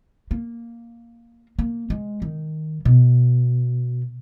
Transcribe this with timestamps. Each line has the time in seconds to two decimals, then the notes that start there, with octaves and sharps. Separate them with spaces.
0.31 A#3
1.59 A#3
1.90 G#3
2.22 D#3
2.85 B2